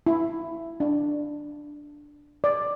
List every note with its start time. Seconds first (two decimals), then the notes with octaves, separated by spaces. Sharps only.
0.07 E4
0.80 D4
2.44 D5